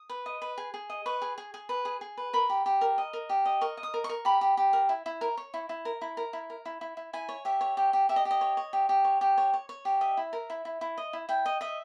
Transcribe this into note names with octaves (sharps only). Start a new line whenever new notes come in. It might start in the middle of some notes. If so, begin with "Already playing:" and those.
Already playing: D#6
B4
D#5
B4
G#4
G#4
D#5
B4 C#6
G#4
G#4
G#4
B4
G#4
G#4
B4
A#4 B5
G4
G4
A#4
D#5
A#4
G4
D#5
A#4 C#6
D#5
D#6
A#4
C#6
A#4
G4 B5
G4
G4
A#4
E4
E4
A#4
C#5
E4
E4
A#4
E4
A#4
E4
A#4
E4
E4
E4
E4 G#5
C#5
G4 E5
C#5
G4
G4
G4 E5
D#5
G4
D#5
C#5
C#5
G4
G4
C#5
G4
C#5
C#5
C#5
G4
D#5 E5
E4
A#4
E4
E4
E4
D#5
E4
E4 G5
D#5
D#5 E5